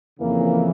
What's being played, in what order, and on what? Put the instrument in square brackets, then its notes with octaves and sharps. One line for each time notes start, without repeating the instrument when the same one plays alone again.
[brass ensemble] F2 C#3 E3 A#3